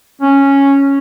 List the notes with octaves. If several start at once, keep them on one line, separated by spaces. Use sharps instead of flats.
C#4